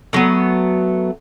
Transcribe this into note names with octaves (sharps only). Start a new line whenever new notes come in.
D3 F#3 A3 B3